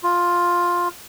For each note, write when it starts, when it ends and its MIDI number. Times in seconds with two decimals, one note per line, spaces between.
0.04 0.88 65